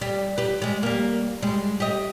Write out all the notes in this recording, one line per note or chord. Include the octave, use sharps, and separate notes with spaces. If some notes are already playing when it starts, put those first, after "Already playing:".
G3
G4 B4
G3 G#3
G3 A#3
G3 G#3
G4 D#5